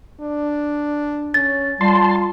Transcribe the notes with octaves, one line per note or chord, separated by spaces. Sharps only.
D4
C#4 A6
G3 F4 A5 C6